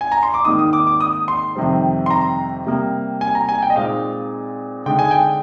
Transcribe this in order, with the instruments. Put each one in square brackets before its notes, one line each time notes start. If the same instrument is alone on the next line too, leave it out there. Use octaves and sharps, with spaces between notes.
[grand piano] G#5
A#5
C6
D6
G#2 D#3 A#3 D#4 D#6
D#6
D6
D6
D#6
C6
F2 C3 D#3 G3 C4
C6
A#5
C3 G3 A#3
G#5
A#5
G#5
G5
D#5
A#2 G#3 C4 D#4 F5
D3 G#3 D#4 G5
G#5
G5